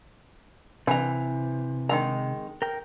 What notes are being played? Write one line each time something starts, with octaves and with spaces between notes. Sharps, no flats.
C3 E3 A#5
D#3 G#3 A#5
A#4 G5